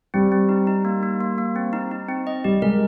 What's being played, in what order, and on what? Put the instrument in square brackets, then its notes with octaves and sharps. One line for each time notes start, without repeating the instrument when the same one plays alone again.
[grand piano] G3 [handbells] C4
[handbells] C4
D#4
D#4
A#3
A#3
A#3
A#3
C4
D#4
D#4
C4
D#5
[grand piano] G3 [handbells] G4
[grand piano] G#3 [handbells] A#4